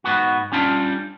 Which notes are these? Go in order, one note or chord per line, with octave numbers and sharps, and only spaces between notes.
G#2 B3 F#4
G3 C#4 D4 F4